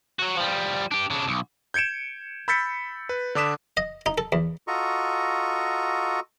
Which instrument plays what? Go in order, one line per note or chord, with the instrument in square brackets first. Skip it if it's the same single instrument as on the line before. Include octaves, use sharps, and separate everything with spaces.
[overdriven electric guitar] F#3 F#4
F3 G3
D4 G4
C#3 D4
B1
[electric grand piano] G6 G#6 C#7 D7 E7
B5 E6 G6 A6 B6 C#7
B4
D3 D4 D6 D#6 B6 E7
[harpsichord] D#5
D#4
A4
E2
[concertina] F4 F#4 A4 D#5 A#5 C#6